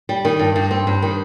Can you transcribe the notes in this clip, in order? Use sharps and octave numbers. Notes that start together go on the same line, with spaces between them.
G3
D#3
G2
G2
C4
G2
D#3